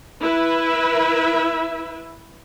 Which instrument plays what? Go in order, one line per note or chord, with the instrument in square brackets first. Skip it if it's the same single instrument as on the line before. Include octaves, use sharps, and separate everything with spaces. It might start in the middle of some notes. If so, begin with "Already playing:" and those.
[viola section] E4 B4 E5